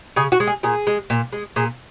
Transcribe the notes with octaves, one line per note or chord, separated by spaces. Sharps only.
C#3 G#4
F#4
G#3
G#4
A#2 G#4
G#3
A#2
G#3
A#2 G#4